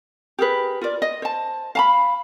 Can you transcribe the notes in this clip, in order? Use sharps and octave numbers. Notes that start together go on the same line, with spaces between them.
G4 G#4 A#4 B4
F4 A#4 D5
D#5
C5 A5
F5 A5 B5